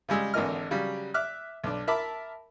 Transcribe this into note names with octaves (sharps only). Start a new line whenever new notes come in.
C#3 G3 G#3 E6
G#1 D3 E3 A#4 D#5 F6
C#3 F#3 G3
E5 D6 F6 F#6
B1 D4
A#4 E5 A5 B5 D6